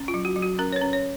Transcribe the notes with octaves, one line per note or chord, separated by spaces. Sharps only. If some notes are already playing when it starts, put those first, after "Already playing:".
Already playing: C#4
F4
F#3
F#4
F#3
F#4
C#4 A#4
C#5
B4
C#4
C#5